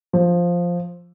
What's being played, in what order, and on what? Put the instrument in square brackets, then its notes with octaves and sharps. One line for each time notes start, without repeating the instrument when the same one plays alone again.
[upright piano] F3